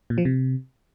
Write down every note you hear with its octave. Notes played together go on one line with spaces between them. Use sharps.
A#2
F3
C3